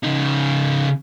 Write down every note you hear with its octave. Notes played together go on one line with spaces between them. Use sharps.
C#3 D#4